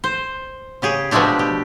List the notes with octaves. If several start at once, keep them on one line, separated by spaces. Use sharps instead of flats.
C5
C#3 G4 G#4
B2 F3 G#3 A3 D4 G4
G4